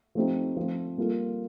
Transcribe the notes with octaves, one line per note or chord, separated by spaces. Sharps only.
F3 A3 C4 D#4 G4
F3 A3 C4 F4
G3 A#3 F4 A4